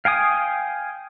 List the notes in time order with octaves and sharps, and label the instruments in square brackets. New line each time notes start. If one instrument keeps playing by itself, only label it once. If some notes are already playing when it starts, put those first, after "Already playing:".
[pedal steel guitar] F5 G5 G#5 D#6